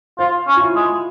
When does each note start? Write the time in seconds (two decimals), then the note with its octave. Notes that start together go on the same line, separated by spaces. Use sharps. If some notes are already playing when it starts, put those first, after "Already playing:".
0.19 F4 C5
0.47 C#4
0.56 F4
0.61 E4
0.76 G#3